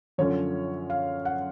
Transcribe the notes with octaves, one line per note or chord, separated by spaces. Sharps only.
F#2 D3 F3 A3 C#4 C#5
F5
F#5